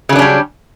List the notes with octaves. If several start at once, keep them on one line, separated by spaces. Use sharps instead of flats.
C#3 F#3 G3 C#4 D4